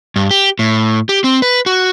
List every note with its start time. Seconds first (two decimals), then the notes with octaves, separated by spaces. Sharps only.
0.16 G2
0.31 G4
0.59 A2
1.09 G4
1.24 C4
1.42 B4
1.66 F#4